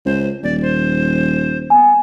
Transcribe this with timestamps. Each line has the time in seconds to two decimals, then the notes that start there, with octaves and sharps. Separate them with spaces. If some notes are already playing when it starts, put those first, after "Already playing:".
0.05 C#2 C5
0.43 D#1 D5
0.61 C5
1.70 B3 G#5